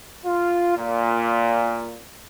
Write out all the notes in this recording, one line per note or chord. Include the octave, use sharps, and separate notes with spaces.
F4
A#2